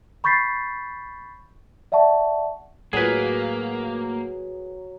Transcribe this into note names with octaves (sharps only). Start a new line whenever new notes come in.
B5 C#6 G6 A6 B6 C7
D5 E5 F#5 A5 C#6
A2 F#3 A#3 F#4 G#4 B4